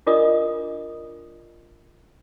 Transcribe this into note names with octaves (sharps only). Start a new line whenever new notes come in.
D4 F4 A#4 D5 D#5 D#6